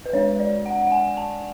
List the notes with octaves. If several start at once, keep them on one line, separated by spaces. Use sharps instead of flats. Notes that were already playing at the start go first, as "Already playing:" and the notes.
B4
G#3 D4 C#5
D5
F#5
F#5
G#5
A5